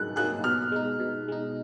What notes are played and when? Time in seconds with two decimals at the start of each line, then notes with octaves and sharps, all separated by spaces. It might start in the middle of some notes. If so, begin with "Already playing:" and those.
Already playing: G#2 F#3 A#3 D#4 G#4 F#6
0.16 F#3 A#3 D#4 G#4 F#6
0.44 B2 F6
0.72 G#3 D#4
1.00 B2
1.28 G#3 D#4